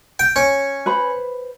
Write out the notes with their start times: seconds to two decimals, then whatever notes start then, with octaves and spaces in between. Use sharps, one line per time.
0.19 G5
0.36 C#4
0.86 B4 C5 B5